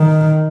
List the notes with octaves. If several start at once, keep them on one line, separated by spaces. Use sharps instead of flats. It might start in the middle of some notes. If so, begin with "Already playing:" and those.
Already playing: D#3